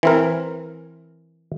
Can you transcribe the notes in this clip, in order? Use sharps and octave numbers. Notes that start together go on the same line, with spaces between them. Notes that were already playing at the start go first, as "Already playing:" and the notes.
E3 C4 A#4